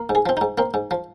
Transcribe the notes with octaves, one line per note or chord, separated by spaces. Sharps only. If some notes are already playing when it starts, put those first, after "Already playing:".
Already playing: A#3
G#2
G#4
F3 C4
D#4
G#2
A#3 C4
G#2
F3